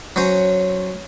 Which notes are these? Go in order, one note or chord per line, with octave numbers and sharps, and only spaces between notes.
F#3 C#4 C5